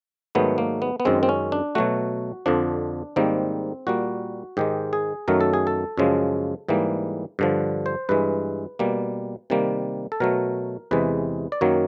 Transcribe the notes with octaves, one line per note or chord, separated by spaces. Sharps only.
G#2 D#3 F#3 A3 B3
A#3
B3
B3
F#2 D#3 G#3 C4
C4
C#4
D4
B2 F#3 A3 F#4
F2 D3 F3 D4
G#2 D#3 G3 A#3 C4
A#2 G3 A#3 F#4
G#2 D#3 G#3 G4
G#4
F#2 D#3 F#3 A3 A#4
A4
G#4
A4
F#2 C#3 F3 G#3
G#2 E3 G3 A#3
G2 D3 F3
C5
G2 E3 G#3 B4
B2 G3 A#3
C3 D#3 G3 A#3
A4
B2 F#3 A3 A#4
E2 C3 E3 G#3 B4
D5
F#2 D#3 F#3 A#3 C#5